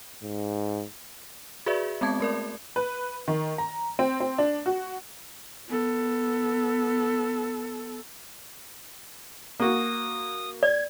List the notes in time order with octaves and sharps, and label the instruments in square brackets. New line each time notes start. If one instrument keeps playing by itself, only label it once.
[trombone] G#2
[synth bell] F#4 G#4 B4 D5 E5
G#3 B3 C4 A5 G#6
A3 A#4 D5
[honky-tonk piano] B4
D#3
A#5
C4
C4
D4
F#4
[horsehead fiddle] B3 A4
[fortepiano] A#3 F#4 [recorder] D#6
[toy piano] D5 [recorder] G#6